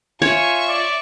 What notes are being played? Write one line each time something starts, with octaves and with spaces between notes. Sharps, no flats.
F4 C#5 E5 G#5 C#6
D5